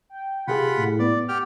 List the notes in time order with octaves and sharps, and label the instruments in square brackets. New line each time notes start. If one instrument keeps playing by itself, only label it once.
[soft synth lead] G5
[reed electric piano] C3 G4 G#4 [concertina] F4 F#5 B5
[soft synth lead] A2
[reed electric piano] B3 [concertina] D5
[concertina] G4 G5 F6 [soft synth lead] F#5